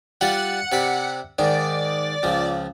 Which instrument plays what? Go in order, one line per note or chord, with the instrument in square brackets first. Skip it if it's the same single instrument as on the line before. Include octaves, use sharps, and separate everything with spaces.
[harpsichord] G3 F4 D5 [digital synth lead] F#5
[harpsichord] C3 D5 B5
[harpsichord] G#2 D#3 [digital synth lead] D5
[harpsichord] C#2 F3